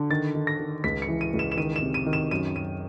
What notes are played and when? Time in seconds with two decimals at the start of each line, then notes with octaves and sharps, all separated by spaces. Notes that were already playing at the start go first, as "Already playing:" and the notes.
Already playing: D3
0.10 D#3 A6
0.35 D#3
0.47 A#6
0.60 D#3
0.84 C#2 B6
1.02 C#7
1.08 E3
1.21 D#7
1.33 C#2
1.39 E7
1.52 E7
1.57 D#3 D#7
1.76 E7
1.82 C3
1.94 D#7
2.06 D#3
2.13 E7
2.31 F#2 D#7
2.55 F#2 D#7